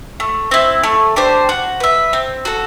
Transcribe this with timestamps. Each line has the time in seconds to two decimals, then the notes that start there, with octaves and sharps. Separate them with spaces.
0.20 A3
0.51 C4 E4
0.84 A3
1.16 D4 G4 C5
1.49 F#4
1.80 B4 E5
2.13 C4
2.45 F#4 A4